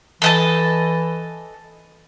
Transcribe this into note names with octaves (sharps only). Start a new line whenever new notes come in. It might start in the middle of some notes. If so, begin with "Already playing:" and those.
E3 A4 D#5 A5